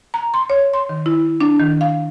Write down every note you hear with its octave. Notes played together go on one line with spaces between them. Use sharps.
A#5
C6
C#5
C6
D#3
E4
D4
D#3
F5